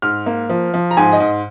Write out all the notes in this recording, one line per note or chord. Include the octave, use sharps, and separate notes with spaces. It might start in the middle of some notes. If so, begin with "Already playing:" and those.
G#2 F6
A#3
F3
F3
A#5
G#2 G#5
D#5
G#2